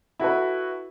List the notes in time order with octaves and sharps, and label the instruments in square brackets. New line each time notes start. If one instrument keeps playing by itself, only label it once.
[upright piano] E4 F#4 A4 B4